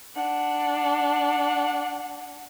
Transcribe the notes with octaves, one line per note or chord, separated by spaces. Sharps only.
D4 F#5